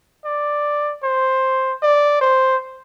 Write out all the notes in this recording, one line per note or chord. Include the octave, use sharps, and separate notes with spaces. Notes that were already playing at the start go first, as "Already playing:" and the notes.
D5
C5
D5
C5